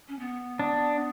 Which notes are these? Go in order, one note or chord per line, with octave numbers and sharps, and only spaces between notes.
C#4
B3
D4